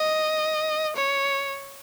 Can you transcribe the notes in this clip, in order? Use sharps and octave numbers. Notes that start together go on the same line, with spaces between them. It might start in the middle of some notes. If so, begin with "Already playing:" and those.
Already playing: D#5
C#5